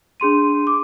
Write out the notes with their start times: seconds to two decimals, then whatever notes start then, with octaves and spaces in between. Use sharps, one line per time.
0.20 D4 G#4 C6 D#7
0.67 D6